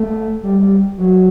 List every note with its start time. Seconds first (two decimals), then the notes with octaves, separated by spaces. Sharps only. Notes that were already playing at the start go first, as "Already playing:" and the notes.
Already playing: A3
0.43 G3
0.61 G3
0.98 F#3